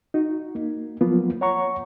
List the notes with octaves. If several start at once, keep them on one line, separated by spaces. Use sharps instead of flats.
D#4 F#4
A#3
F3 F#3 A#3 B3 F4
C#5 F#5 A#5 C#6